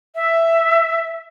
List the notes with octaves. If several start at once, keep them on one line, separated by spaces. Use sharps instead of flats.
E5